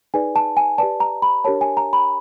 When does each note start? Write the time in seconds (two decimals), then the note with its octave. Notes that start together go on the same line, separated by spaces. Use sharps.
0.14 D#4 G#4 B4 D5 G#5
0.36 A5
0.57 G#5
0.78 G4 B4 D5 A5
1.00 A#5
1.22 B5
1.44 D4 G4 A#4 C#5 A5
1.61 G#5
1.77 A#5
1.93 B5